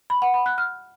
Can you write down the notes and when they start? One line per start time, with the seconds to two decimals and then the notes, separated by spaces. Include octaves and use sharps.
0.10 B5
0.22 F#5
0.34 B5
0.46 F#6
0.58 F6